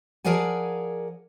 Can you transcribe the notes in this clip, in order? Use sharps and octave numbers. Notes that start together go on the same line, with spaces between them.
F3 G#4 A#4 D5 F#5 G#5